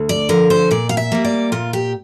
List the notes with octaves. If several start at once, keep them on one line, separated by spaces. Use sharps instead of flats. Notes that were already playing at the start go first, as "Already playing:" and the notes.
Already playing: D2
D5
D3 F3 A#4
C5
A#2 D5
F5
E5
G3 A#3
D5
A#2 F4
G4